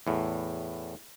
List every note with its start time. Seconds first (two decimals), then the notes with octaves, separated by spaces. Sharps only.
0.07 E2 A2